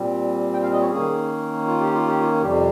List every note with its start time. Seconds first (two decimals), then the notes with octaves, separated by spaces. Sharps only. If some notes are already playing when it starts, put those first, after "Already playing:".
Already playing: A#2 G3 C4
0.53 G5
0.62 F5
0.72 D#5
0.81 C#5
0.90 D#3 A#3 C#4 G#4
1.67 F4
1.80 G4
1.93 F4
2.07 G4
2.20 F4
2.41 F2 C3 G3 G4